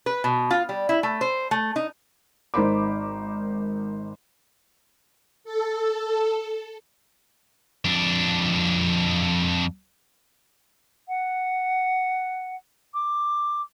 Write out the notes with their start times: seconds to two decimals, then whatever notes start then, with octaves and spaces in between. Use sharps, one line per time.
0.06 B4
0.24 B2
0.51 F4
0.69 G3
0.89 E4
1.03 A3
1.21 C5
1.51 A3
1.76 D#4
2.54 G#1 D#4 A#4 C5 B5 D6
5.44 A4
7.85 F2 D4
11.08 F#5
12.94 D6